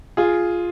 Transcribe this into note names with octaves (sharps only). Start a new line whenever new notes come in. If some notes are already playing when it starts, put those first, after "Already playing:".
F4 G#4